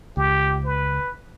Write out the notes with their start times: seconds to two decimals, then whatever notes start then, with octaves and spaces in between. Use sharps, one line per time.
0.17 C#2 G4
0.65 B4